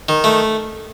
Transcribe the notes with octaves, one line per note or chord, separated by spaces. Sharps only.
D#3
A3